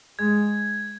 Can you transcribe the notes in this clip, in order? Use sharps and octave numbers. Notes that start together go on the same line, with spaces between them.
G#3 G#6